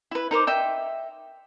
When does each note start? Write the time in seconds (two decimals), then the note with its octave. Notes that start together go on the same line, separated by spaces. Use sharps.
0.11 E4 B4
0.31 D#4 A#4 C5 D6
0.47 D#5 E5 G5